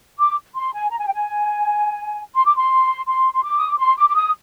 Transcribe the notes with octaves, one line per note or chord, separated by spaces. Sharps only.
D6
C6
G#5
A#5
G#5
G5
G#5
C6
D6
C6
C6
C6
D6
D#6
D6
C6
D6
D6
D#6